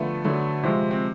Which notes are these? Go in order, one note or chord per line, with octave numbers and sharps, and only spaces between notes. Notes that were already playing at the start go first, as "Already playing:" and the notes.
Already playing: D3 F3 A3 B3
D3 F#3 A3
C3 F3 G#3 C4
C4